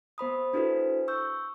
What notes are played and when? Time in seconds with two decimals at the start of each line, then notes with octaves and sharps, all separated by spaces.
0.18 B3 C5 B5 D#6
0.53 D4 E4 F#4 A4 B4 C5
1.08 C#6 E6 G6